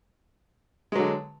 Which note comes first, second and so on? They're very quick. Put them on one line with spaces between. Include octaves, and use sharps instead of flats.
G#3 F#3 D3